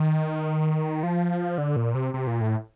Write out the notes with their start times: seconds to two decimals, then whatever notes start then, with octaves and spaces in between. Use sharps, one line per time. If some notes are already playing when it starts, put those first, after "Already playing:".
Already playing: D#3
1.03 F3
1.58 D3
1.76 A#2
1.95 C3
2.14 C3
2.27 A#2
2.41 A2